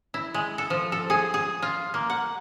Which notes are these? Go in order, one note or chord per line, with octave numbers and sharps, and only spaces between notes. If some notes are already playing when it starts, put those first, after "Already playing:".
E4
G#3
A4
F3
A4
G#4
G#4
F4
A#3
F#5